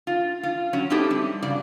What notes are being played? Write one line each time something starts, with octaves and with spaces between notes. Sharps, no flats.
F4
F4
F#3 C#4
G3 C4 D#4 E4 G4 A4
G3
G2 C#3 F#3 D5